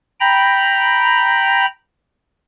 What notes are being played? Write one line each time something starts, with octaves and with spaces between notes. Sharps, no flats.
G5 A#5 B5